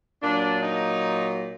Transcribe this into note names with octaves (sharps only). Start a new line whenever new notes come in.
A#2 F#3 D4
D#4